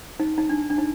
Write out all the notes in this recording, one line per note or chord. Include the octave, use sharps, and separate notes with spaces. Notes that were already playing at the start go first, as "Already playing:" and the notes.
D#4
D#4
D4
D4
D#4